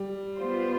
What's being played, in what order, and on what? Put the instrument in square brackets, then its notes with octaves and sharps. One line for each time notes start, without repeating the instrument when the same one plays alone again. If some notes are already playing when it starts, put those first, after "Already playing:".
Already playing: [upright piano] G3
[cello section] B3 F4 C5